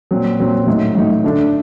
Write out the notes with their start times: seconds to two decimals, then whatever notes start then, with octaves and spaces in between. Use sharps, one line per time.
0.11 A#2 F#3 C4
0.39 A#2 F#3 C4
0.67 A2 F#3 A3 D#4
0.95 A2 F#3 A3 D#4
1.24 D3 A3 D4